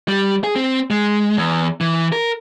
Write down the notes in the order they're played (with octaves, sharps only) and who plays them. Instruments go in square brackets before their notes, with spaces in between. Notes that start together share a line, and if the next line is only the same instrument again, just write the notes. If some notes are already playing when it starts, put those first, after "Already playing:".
[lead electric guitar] G3
G#4
C4
G#3
E2
E3
A#4